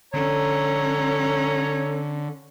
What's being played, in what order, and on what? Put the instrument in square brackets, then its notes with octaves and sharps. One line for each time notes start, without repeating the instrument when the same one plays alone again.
[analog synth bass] D3 [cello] C#4 [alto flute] A4 [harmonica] C#5 A#5